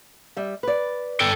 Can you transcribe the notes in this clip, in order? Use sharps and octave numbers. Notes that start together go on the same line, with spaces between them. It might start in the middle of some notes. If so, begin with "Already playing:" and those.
G3 E5
B4 D5
A4 G5